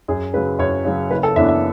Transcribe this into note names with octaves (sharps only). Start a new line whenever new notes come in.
F#2 G#4
C#3 F#3 B4
F#2 C#5
C#3 F#3
F#1 B4
A4
F#2 E3 B3 D4 E5
E5